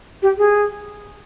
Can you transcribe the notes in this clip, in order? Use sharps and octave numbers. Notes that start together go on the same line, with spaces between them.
G4
G#4